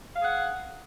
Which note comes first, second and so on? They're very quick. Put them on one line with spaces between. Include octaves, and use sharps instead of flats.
F5 G#4 F#5